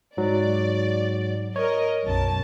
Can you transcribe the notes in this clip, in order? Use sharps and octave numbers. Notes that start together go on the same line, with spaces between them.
G#2 F#3 D5
A#4 C#5 D#5
B1 F#2 A5